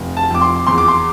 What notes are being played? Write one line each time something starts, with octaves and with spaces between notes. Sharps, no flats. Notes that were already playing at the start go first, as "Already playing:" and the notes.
Already playing: F1
A5
F2 D6
C6
E2 C6
D6
C6